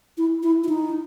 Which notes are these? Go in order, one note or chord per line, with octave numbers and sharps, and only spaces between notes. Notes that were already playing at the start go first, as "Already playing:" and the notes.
E4
E4
E4
D#4